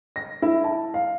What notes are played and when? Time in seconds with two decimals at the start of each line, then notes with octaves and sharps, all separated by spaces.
0.16 A#6
0.42 E4
0.64 A5
0.94 F5